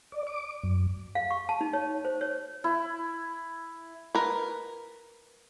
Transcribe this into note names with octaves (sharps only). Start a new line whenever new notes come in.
D5
D6
F#2
F5
C#6
A5
D#4
C#5
C5
C#5
E4
A#4 B4